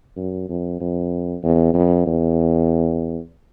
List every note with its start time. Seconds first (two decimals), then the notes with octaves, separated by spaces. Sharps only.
0.16 F#2
0.49 F2
0.80 F2
1.43 E2
1.74 F2
2.06 E2